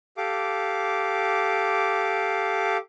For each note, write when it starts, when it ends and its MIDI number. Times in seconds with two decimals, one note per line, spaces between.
0.17 2.77 67
0.17 2.77 69
0.17 2.77 77
0.17 2.77 86